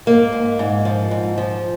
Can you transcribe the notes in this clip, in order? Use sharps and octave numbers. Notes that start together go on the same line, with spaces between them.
G#2 A#3
G#2
G#2
F3
G#2
F3